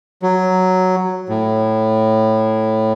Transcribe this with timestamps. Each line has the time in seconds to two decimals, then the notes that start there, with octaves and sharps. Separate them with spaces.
0.22 F#3
1.29 A2